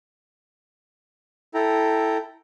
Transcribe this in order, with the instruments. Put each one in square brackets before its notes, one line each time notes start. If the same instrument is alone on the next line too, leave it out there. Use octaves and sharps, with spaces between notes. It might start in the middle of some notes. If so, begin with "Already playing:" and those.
[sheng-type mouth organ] E4 A4 G5 A#5